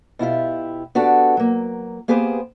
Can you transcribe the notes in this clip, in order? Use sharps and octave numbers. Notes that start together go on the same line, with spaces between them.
B2 E4 F4 G4
B3 D4 F#4 G4 A4
F#3 A#3
A#3 B3 G4 G#4 B4 C5